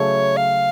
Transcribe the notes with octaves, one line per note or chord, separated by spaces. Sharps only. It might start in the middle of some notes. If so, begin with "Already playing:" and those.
Already playing: C#3 F#3 A3 C#5
F5